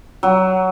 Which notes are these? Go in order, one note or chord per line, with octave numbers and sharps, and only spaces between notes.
F#3